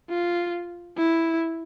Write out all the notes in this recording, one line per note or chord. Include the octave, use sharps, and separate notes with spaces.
F4
E4